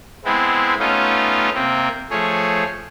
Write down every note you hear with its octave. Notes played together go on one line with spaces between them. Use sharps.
G#3 B3 C4 E4
A3 B3 C#4 D#4 F4
C3 A#3 C4
F3 A3 G#4 C#5